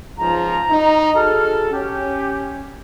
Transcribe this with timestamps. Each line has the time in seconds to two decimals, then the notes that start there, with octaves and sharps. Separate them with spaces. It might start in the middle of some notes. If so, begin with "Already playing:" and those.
0.18 C#2 G#2 F3 A#5
0.70 D#4
1.15 F#4 G#4 A4 F6
1.71 C#4 G4